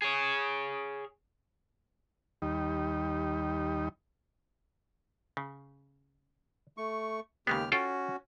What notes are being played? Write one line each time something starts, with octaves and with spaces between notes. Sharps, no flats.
G#4 C#5
D#2 G3 D#4
C#3
A3 C#6
D#2 C#3 G#3 B3 G4 F6
C#4 F4 F#4 A4 G5